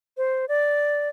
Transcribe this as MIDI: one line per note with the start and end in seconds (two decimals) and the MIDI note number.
0.17 0.45 72
0.49 1.09 74